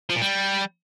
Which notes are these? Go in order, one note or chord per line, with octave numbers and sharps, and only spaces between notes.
F3
A#2
G3